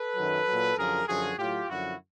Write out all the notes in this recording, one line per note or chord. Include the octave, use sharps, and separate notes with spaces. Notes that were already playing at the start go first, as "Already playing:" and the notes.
Already playing: A4 B4
F#2 D#3 F#3
A#2 F#3
F#2 D3 F3 G#4 A#4
F#2 D3 F3 F#4 G#4
A2 F#3 F4 G4
F#2 D3 F3 E4 F#4